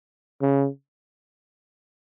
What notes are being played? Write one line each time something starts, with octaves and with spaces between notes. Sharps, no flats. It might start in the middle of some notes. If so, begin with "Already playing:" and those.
C#3